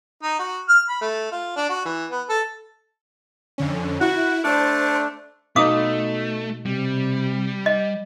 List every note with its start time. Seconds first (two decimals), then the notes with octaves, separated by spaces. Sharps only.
0.23 D#4
0.39 F#4
0.69 F6
0.89 B5
1.01 A3
1.31 F4
1.56 D4
1.70 F#4
1.86 E3
2.11 B3
2.30 A4
3.58 F2 D3 C#4
4.01 E4 F#4
4.44 A3 D4 C5 A5
5.56 B2 A3 D#4 D#5 F5 D6 D#6
6.66 C3 G3
7.66 D#5